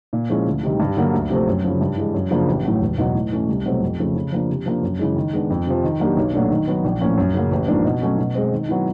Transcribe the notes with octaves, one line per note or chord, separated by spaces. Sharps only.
A#2
F3 G#3 C#4 E4
D2
C3 D#3 G3
G2
D3 F#3 A#3
D2
C3 F3 A3 C4
F#2
C#3 F3
G2
E3 G#3
F#2
C#3 F3 A#3 D4
A1
A2 F#3
E1
E2 B2 F#3
A2
E3 A3 C#4
C2
B2 F#3 A3 C4
F2
C#3 F3 A3
C#3
F3 A#3 D4
C3
F3 A#3 D4
F#2
C#3 E3 G#3
D#3
G#3 B3 D4
F2
C3 F3
D#3
F#3 A#3 D4 G4
B1
A#2 F#3 A3 D4
D#3
F#3 B3
A#1
A2 F3 A#3 C#4
F#2
C#3 F#3 A#3
A1
G#2 F3 A#3 D4
B2
F#3 A3 C#4
B2
G#3 C4
D#3
F#3 B3 E4